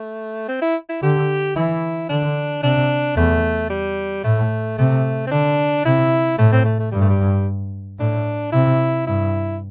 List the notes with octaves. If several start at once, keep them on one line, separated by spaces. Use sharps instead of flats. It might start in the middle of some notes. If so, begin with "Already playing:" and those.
Already playing: A3
C4
E4
E4
D3 G4
E3 E4
D3 D4
C3 D4
E2 A3
G3
A2 A3
C3 A3
C4
D3 D4
C3 E4
A2 A3
C4
A3
A3
G2 G3
A3
G3
A2 D4
C3 E4
G2 E4